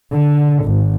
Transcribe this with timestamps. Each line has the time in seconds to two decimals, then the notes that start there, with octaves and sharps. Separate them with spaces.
0.12 D3
0.62 G#1